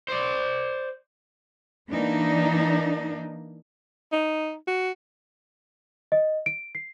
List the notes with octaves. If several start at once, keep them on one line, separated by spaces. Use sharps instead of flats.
C5 D5
E3 A#3 D4 D#4
D#4
F#4
D#5
D7
C7